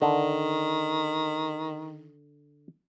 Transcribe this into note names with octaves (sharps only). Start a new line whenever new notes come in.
D3 D#3